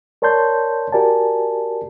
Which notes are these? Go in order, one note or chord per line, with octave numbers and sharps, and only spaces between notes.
A#4 C#5 D5 A5 C6 G6
F#4 G4 A#4 D5 G#5 A5